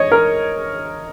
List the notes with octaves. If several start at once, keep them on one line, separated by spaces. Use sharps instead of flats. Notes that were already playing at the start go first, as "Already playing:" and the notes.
Already playing: C#5 D#5
A#4